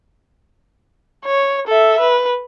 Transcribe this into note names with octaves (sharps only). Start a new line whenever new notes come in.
C#5
A4 E5
B4